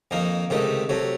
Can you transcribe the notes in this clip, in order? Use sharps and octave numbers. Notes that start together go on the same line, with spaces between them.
F2 D#3 A#3 D#4 A#4
C#2 C3 D#3 A3 D#4
C3 F#3 A3